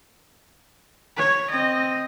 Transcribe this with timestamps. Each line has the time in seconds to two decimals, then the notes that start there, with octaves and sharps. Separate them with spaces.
1.17 C#5
1.50 C4 D#5